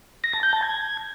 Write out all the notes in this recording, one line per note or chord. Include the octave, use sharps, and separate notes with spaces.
A#6
A5
G6
A5
G#6